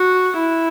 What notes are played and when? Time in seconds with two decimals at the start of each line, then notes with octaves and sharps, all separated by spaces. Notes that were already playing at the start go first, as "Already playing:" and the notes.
Already playing: F#4
0.38 E4